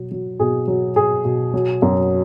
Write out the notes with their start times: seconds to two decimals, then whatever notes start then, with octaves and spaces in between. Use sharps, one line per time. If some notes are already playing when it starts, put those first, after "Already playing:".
Already playing: B2 F#3
0.11 F#3
0.40 B2 G#4
0.68 F#3
0.96 B2 G#4
1.25 B2
1.54 F#3
1.82 F#2